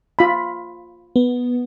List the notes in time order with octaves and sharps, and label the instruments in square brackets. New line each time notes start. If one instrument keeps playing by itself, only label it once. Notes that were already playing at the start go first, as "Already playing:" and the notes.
[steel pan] F4 B5
[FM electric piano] B3